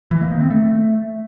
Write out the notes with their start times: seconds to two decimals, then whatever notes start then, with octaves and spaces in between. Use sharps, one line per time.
0.11 E3
0.21 A#3
0.31 D#3
0.41 C4
0.51 A3